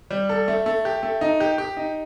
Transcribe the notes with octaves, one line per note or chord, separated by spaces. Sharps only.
G3
A4
A3
A3
G4
A3
D#4
G4
G4
D#4